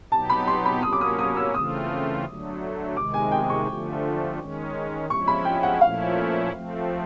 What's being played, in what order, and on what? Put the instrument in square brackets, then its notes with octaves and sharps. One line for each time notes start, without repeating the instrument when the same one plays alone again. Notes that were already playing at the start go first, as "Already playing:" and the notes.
[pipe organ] B2 F#3 B3 D#4 G4 [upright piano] A5
[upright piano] B5
C6
B5
[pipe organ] F#3 A#3 C#4 [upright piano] D#6
[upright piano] D6
D#6
D#6
E6
[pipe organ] C#3 E3 A3 C4 F4 [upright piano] D#6
[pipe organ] D3 F#3 A3
[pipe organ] C3 D#3 G#3 [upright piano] D6
[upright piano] G#5
G5
C#6
[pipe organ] D3 F3 A3
D#3 G#3 C#4
[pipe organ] F3 G#3 C#4 E4 [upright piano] C#6
[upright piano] B5
G5
F#5
[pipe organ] A#2 F3 A3 C#4 E4 [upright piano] F5
[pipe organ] F3 A3 C4